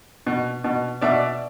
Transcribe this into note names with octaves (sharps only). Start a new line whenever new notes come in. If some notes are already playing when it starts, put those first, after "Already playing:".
B2
B2
B2 D5 E5